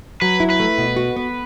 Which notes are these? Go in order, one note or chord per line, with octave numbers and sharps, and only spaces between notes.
F#3 B4
E4
B4
A3
B2
F#4
B3